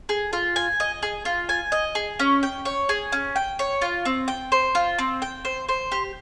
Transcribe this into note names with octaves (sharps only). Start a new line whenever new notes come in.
G#4
F4
G#5
D#5
G#4
F4
G#5
D#5
G#4
C#4
G5
C#5
G#4
C#4
G5
C#5
F4
C4
G5
C5
F4
C4
G5
C5
C5
G4